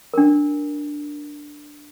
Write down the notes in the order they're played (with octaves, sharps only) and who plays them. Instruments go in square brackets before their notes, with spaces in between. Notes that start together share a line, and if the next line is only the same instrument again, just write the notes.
[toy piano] D4 A#4